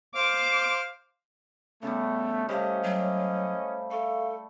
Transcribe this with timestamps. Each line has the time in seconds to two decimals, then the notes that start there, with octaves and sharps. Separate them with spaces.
0.16 C5 F5 D6
1.83 C#3 G3 A3 B3
2.49 G3 A3 C#4 G4 C5 D#5 F5
2.83 F#3
3.91 A4 E5 F5 C#6